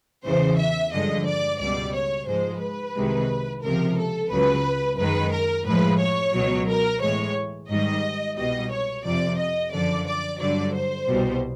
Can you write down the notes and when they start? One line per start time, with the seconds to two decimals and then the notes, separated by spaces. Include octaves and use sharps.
0.25 E2 C#3 E3 C5
0.58 E5
0.92 G2 D3 F3 G#3 D#5
1.26 D5
1.60 C#2 B2 G3 D5
1.94 C#5
2.27 G#2 F3 G#3 C5
2.61 B4
2.96 C2 C3 D#3 G#3
3.63 C#2 C3 F3 A#4
3.97 A4
4.30 C#2 C#3 F#3 B4
4.98 F#2 D#3 G#3 B4
5.32 A#4
5.66 A2 F3 G#3 B4
5.99 C#5
6.34 C#2 B2 F#3
6.68 A#4
7.01 A2 E3 G#3 C#5
7.69 G#2 D#3 G3 D#5
8.37 C2 B2 G3 D#5
8.71 C#5
9.04 F2 C3 F3 D5
9.38 D#5
9.72 F#2 D3 F3 D5
10.07 D5
10.40 G2 D3 F#3 D5
10.74 C5
11.08 C2 B2 G3